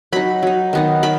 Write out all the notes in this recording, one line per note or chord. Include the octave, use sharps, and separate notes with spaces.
F#3 D#4 B5
F#3 D#4
D#3 B3 D#4
D#3 B5